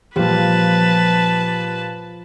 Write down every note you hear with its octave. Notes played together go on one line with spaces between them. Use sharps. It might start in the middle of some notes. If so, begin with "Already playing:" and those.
A#2 F3 G3 B4 A5